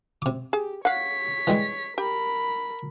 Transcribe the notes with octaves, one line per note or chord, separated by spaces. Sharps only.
C3 D6
G4 G#4
C#5 F5 F#5 B6
E3 G3 G#3
G4 A#4 B5